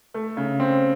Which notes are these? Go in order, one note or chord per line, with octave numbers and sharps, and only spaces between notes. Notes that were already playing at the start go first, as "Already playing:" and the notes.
A3
C#3
C4